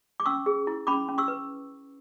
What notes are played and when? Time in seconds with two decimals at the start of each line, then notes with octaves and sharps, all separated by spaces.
0.20 D6
0.26 C#4 C#6 E6
0.46 G#4
0.67 E4
0.87 C#4 B5 D6
1.08 C#4
1.18 C#6 E6
1.28 B4